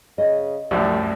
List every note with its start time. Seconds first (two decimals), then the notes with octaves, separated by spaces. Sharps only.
0.18 C#3 D#5
0.71 C2 F#2 A2 F3 G3